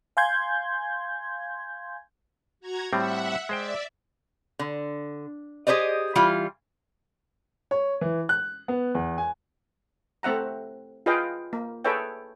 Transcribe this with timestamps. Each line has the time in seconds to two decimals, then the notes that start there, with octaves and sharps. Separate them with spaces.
0.17 F5 G#5 C6 G6 G#6
2.60 F#4 A#5 G#6
2.93 A2 G3 C4 E5 F#5
3.49 G#3 C5 D5 E5 G5
4.59 D3
5.67 G4 G#4 C5 D5 D#5
6.15 E3 G3 F4
7.71 C#5
8.01 E3
8.29 F#6
8.68 B3
8.95 E2
9.18 G#5
10.23 A3 C4 E5 F#5 A#5
11.06 F4 G#4 B4 D#5 F5 G5
11.53 A#3
11.85 G#4 A4 B4 C#5 E5 G5